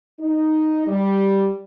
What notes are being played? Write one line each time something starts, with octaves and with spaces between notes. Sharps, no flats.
D#4
G3